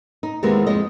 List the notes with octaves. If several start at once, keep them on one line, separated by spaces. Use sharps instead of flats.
D#4
D#2 C3 E3 G#3 A#3 B3
F2 G#3 D#5